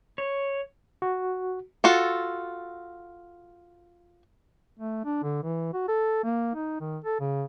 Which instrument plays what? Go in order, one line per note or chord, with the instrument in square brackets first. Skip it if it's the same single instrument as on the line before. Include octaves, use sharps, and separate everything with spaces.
[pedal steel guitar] C#5
[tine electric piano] F#4
[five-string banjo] F4 F#4 A4
[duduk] A3
D4
D3
E3
F#4
A4
A#3
D#4
D#3
A4
C#3